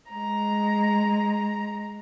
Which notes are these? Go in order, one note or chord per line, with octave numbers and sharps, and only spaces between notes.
G#3 A#5